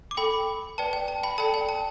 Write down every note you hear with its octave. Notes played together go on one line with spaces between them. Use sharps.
D6
A4 G5 B5
B4 D5 G5 A5
G5
A5
G5 B5
A4 D5 G5 A5
G5
A5